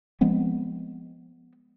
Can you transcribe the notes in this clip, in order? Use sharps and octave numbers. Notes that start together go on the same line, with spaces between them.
F3 G#3 B3 C4